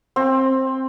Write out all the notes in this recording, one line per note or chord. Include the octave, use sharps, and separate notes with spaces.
C4